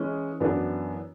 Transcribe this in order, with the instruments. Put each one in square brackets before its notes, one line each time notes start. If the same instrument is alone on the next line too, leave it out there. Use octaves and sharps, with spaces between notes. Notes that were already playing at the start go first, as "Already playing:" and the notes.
Already playing: [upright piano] E3 G#3 C#4 G#4
F#2 E3 B3 D4